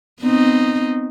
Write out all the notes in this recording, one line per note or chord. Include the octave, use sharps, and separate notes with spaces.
B3 C4 D#4